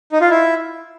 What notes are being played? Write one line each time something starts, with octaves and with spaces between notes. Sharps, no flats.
D#4
F4
E4